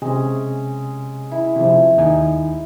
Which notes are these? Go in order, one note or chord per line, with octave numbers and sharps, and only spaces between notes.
C3 G#3 C#4
E4
C3 F3
D#2 D#4 G#5